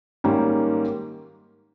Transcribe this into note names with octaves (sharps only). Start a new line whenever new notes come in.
G#2 D#3 G3 A#3 C#4